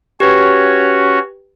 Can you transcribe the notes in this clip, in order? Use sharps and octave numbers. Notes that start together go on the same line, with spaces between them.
C#4 F#4 G4 B4 C#5